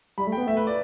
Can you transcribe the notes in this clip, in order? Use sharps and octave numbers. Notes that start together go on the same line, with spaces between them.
G3 B5
A3
B3 G5
A3 E5
B4
D5